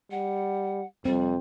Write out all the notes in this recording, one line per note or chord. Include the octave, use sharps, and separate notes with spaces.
G3 F#5
F2 G3 C4